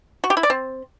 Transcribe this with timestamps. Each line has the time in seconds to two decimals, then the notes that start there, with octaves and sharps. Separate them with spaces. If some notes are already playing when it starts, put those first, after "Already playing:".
0.24 F#4
0.30 G4
0.37 E4
0.43 D5
0.50 C4